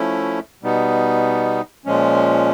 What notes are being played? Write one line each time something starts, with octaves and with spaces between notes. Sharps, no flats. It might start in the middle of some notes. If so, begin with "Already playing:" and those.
Already playing: F3 A3 C#4 E4
B2 G3 B3 D#4
A#2 F3 G#3 C#4